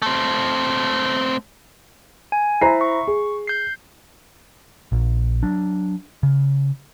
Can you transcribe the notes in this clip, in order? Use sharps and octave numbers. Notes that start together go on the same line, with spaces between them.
A3 C4
G#5
E4 C5 E5 A#5 C7
C#6
G#4
G6 C7
A#1
F#3 D4
C#3